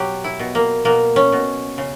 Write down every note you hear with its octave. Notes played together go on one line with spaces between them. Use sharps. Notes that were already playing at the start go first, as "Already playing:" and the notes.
Already playing: B2 F#3 G4
E4
B2
A#3
B2 A#3
C#4
B2
C#3